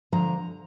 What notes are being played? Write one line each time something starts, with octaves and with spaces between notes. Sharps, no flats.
D3 F3 A#5